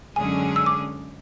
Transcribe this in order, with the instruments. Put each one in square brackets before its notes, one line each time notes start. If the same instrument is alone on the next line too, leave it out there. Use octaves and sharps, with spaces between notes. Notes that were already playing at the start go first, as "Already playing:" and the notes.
[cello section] F#2 D3 G#3 C#4 G#4 [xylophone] G#5
[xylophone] E6
D6